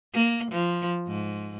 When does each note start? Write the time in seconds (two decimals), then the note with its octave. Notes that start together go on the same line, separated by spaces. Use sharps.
0.13 A#3
0.52 F3
1.07 G#2